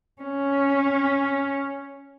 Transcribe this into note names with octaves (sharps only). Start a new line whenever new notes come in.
C#4